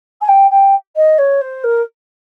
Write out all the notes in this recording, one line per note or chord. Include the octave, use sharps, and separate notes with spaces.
G#5
G5
G5
D#5
C#5
C5
A#4